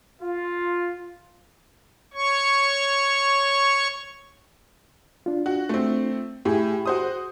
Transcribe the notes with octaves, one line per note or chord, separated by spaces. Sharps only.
F4
C#5 C#6
D4 F4
F#4
A3 C4
A2 G4 G#4 G#5
F#4 C5 D#6